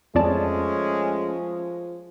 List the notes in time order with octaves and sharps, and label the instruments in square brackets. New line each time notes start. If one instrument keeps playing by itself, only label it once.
[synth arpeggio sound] F2 D5 A5 [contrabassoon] F3 [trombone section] G#3 A3 C#4